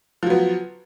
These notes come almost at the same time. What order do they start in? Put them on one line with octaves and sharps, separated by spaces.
F3 F#3 B3